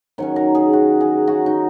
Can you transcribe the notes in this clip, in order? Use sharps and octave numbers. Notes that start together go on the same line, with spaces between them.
D#3 F#3 C#4 C#5
A#4
G#4
F#4
G#4
F#4
D#4